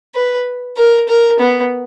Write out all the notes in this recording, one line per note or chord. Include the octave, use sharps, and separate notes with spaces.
B4
A#4
A#4
B3